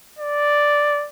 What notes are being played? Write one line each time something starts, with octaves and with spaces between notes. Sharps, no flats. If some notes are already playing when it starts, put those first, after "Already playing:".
D5